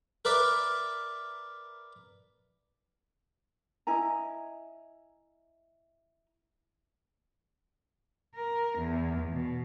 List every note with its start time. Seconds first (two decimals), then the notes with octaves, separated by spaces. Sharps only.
0.25 A#4 B4 D5 E5
3.87 E4 D#5 G#5 A#5
8.35 A#4
8.78 E2
9.33 B2